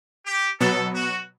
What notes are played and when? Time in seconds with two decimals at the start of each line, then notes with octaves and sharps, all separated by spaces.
0.26 G4
0.61 B2 F#3 B3 A4
0.95 F#4